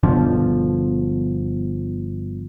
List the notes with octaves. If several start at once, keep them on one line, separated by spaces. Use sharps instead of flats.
G1 B2 D3 F3